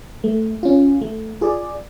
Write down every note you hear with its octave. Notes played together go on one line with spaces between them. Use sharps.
A3
C#4 F4
A3
F4 G#4 D5